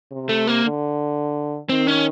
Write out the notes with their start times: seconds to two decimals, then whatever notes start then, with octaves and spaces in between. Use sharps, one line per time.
0.12 C3
0.29 A3
0.47 A#3
0.64 D3
1.69 D#3 C4
1.87 C#4